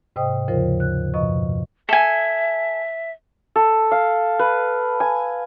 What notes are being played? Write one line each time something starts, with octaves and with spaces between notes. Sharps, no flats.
G#2 C3 C5 D#5 G5 D#6
D#2 C#3 F3 F4 A#4 C5
F#6
F#2 B2 F3 D#5 C#6
A4 E5 G#5
A4
F5
B4
G#5